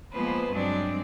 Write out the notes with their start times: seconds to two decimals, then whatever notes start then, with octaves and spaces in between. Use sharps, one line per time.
0.12 F3 G#3 A#3 B3 B4 C5
0.51 G2 F#3 G#3 C4 D4 D5